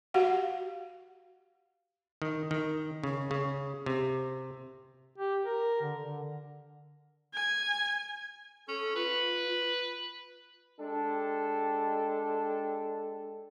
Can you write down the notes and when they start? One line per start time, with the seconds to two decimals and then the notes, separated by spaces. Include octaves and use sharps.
0.14 F#4 G4 F5 F#5
2.22 D#3
2.51 D#3
3.04 C#3
3.31 C#3
3.86 C3
5.18 G4
5.45 A#4
5.82 D3
6.00 D3
7.34 G#5
8.68 C#4 A4
8.95 F4 B4
10.79 G#3 D4 G4 A4